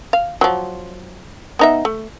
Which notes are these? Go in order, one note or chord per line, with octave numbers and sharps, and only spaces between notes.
F5
F3 F#3
B3 D#4 E5
A3